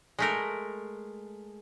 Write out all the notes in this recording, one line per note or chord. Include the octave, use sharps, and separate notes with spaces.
G#3 A3 A#4